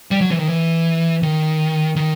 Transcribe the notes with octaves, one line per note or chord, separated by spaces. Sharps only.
G3
F#3
E3
D#3
E3
D#3
D#3